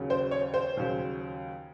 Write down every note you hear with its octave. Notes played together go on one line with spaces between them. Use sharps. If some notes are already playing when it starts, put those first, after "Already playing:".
Already playing: D#2 C#3 F#3 C#4
C5
C#5
C5
D#2 C#3 F#3 C#4